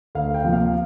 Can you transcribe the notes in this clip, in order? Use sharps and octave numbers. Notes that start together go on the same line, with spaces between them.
D2 F5
G5
C3 F3 A#3
F5